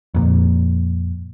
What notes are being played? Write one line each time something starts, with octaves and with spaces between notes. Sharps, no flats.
F2 A#2